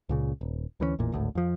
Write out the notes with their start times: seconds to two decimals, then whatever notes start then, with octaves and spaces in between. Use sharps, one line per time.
0.09 C#2 A#2 C#3
0.41 D#1
0.80 D2 E3 G3 C#4
0.99 A1 E2 A#2
1.12 G#1 D2 A2
1.35 F2 F3